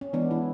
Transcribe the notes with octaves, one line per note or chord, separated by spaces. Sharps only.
C#4
E3 G#3 B3 D4
E4